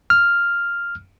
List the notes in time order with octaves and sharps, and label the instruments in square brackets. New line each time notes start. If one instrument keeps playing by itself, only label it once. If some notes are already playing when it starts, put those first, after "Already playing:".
[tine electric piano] F6